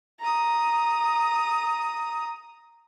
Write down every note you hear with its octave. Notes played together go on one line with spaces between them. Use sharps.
A#5 D#6